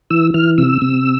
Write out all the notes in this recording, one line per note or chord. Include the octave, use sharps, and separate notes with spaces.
E3 E6
E3 F6
C3 E6
C3